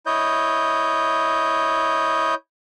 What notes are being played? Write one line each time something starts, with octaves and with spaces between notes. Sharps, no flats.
E4 C#5 D#5 G6